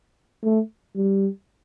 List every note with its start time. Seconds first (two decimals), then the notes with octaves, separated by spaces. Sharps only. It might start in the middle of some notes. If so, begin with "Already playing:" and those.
0.43 A3
0.96 G3